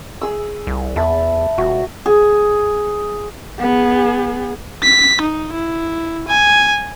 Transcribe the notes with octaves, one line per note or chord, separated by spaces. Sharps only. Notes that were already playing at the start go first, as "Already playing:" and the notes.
G#4 E6
C2
E2 E5 A5 B5
D#1 F#4
G#4
B3 G#4
B6
D#4
E4
G#5